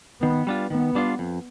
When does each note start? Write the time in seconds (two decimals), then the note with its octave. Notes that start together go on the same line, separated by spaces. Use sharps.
0.22 D#3 B3
0.47 G3 D4 F4
0.70 D#3 B3
0.95 G3 D4 F4
1.19 F2